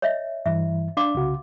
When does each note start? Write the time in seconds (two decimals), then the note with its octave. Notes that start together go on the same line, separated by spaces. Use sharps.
0.02 C#5 D#5 E5
0.46 G2 E3 E5
0.97 D4 F5 C6 D6
1.15 C2 C#3 F#4